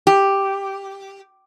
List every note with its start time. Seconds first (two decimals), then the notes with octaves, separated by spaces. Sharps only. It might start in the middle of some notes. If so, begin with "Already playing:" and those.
0.07 G4